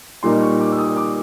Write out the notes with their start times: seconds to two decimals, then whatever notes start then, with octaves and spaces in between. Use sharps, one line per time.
0.23 A#2 G3 A#3 D#4 C6
0.42 C#6
0.60 D6
0.72 E6
0.78 D#6
0.96 D6